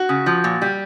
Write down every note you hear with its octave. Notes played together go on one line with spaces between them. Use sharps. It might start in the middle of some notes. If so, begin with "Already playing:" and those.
Already playing: F#4
C#3
F3
A#2
G3